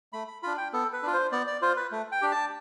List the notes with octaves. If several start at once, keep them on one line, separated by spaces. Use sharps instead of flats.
A3 B5
B5
D4 F4 B5
G5
B3 A4
B4
D4 F4
C5
B3 D5
D5
F4 C5
B4
A3
G5
D4 G4
A5